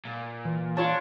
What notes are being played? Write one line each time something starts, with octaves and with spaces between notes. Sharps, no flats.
A#2
E3
D4 F4 C#5 A5